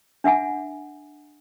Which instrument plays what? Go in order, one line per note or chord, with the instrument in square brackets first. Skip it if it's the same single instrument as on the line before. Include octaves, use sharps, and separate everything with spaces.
[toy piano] D4 E5 F#5 G#5